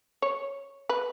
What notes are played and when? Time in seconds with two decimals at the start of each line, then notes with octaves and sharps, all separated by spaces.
0.22 C#5
0.89 B4